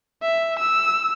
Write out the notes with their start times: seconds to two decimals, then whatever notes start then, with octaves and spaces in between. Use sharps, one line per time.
0.23 E5
0.60 E6